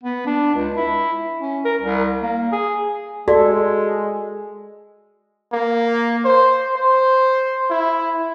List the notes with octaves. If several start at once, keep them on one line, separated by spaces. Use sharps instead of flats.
B3
D4
C#2
E4
C#4
A#4
C2
A#3
G#4
G#3 F#4 A4 D5
A#3
C5
C5
E4